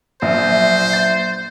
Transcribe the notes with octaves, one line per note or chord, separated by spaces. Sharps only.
A#1 F#3 A#3 C5 E5
A6